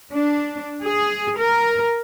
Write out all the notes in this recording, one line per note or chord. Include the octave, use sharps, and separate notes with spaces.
D4
G#4
A#4